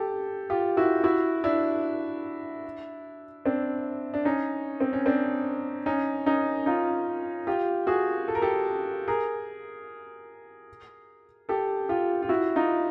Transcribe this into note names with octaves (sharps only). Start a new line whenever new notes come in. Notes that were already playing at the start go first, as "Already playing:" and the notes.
Already playing: G4 A4
F4 G4
E4 F#4
E4 F#4
D4 E4
C4 D4
D4
C#4 D#4
C4
C#4
C4 D4
C#4 D#4
C#4 D#4
D#4 F4
F4 G4
F#4 G#4
A4
A#4
G4 A4
G#4 A#4
G4 A4
F4 G4
F4
E4 F#4
D#4 F4